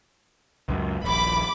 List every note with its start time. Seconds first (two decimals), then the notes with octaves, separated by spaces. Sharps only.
0.69 C#2 F#2
1.02 D#1 A#1 B5 D6